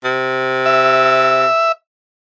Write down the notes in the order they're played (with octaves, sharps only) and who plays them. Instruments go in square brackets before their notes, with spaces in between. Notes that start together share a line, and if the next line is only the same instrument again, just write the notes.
[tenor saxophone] C3
[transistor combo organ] E5